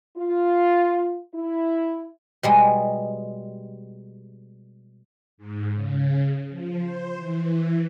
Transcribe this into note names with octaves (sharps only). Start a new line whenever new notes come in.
F4
E4
B2 G3 G#3
G#2
C#3
F3
C5
E3